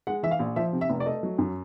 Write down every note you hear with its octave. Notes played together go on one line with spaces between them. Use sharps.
G#3 F#5
E3 E5
F5
A#1
F3 E5
C3
E5
F1
D5
A3 D#5
F#3
F#2